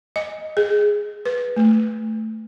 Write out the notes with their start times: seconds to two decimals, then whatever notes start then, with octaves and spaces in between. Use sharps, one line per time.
0.16 D#5
0.57 G#4
1.25 B4
1.56 A3